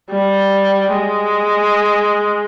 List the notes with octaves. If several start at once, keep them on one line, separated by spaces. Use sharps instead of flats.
G3
G#3